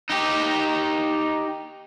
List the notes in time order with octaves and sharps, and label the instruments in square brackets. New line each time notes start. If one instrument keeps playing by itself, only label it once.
[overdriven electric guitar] D#4 G4